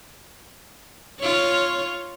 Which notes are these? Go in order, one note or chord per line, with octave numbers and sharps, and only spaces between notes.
F4 C#5